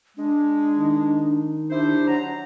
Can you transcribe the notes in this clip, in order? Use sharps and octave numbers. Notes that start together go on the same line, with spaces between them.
G#3 D4
D#3 D#4
D4 E4 G4 C5
F#3 A#5